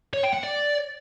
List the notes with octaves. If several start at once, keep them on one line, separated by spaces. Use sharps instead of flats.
C#5
G5
F#5
D5